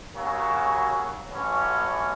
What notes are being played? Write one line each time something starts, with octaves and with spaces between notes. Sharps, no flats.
D#2 C#3 F#3 C#4 F#4
A1 A2 F#3 C#4